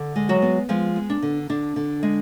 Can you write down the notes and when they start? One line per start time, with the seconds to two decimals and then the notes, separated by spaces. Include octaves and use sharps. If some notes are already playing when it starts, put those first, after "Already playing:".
Already playing: D3
0.16 G#3
0.29 F#3 F#4
0.42 B3
0.69 F3 G#3 F4
0.96 B3
1.10 D4
1.22 D3
1.49 D3 D4
1.76 D3
2.03 G#3